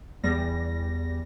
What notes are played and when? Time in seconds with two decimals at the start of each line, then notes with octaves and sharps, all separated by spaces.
0.23 E2 G3 A#6